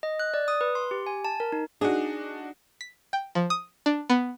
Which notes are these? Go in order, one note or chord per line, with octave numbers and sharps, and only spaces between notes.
D#5
F#6
D5
D#6
B4
C6
G4
G#5
A5
A#4
D#4
D4 D#4 F#4 G#4
B6
G5
F3
D#6
D4
B3